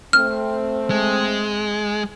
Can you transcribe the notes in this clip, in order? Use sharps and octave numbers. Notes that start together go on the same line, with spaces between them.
A3 C4 F6
G#3